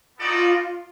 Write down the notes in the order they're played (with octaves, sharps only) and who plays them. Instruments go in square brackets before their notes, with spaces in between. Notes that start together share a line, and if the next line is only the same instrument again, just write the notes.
[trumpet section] B3 D#4 F#4 A4 D5 [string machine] F4